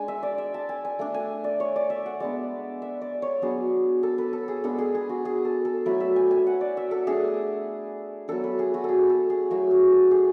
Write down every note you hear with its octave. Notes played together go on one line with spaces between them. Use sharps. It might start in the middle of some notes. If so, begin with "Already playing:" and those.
Already playing: G#3 D4 G#5
E5
D5
E5
A5
G#5
G#5
A3 D4
G#5
D5
C#5
D5
E5
F#5
G#3 B3 D4 D5
E5
D5
C#5
F#3 B3 D4 G#4
A4
B4
A4
G#4
G#3 B3 D4 A4
G#4
G#4
F#4
G#4
A4
A4
F#3 A3 E4 B4
E5
G#5
G#5
F#5
D5
E5
A4
A3 D4 G#4
F#3 B3 D4 A4
B4
G#4
F#4
G#4 A4
A4
G#4
F#3 A3 E4 F#4
G#4
A4
G#4